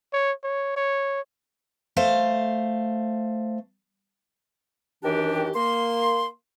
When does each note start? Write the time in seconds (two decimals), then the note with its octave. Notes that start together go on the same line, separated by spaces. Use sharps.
0.13 C#5
0.44 C#5
0.76 C#5
1.97 A3 C5 F5
5.03 F#2 D#3 E3 D4 G4
5.54 A#3 C6